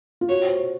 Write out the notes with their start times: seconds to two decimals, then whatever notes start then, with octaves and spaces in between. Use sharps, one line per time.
0.21 F4
0.29 F#4 C#5
0.46 C5